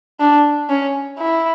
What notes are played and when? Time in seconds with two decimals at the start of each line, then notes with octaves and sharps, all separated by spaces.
0.20 D4
0.69 C#4
1.18 E4